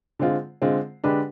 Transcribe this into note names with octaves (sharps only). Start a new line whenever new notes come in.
D3 G#3 C4 F4
D3 G#3 C4 F4
D3 G#3 D4 G4 B4